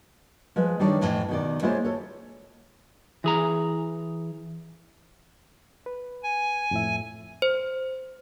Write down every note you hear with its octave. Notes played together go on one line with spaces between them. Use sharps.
F3 G#3 B4
D#3 G3 D4 D#4 C#5
F2 A2 E3
B2 D#3 D5
G#3 A#3 E4 F4 C5 C#5
A4 C#5
E3 G#4 A#5
B4
G#5
F2 A2 E5
C5